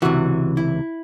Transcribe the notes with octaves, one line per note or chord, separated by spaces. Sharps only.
C#2 C3 E3 F#4
E4